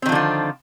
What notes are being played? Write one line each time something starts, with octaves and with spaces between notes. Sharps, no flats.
D3 D#3 F3 C4 F4